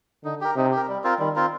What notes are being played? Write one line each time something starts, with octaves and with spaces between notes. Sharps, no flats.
D3 D#4
G4 A#4
C3 D#4
G4
A#4
G3
C4 F4 A#4
D#3 G3
C4 F4 A#4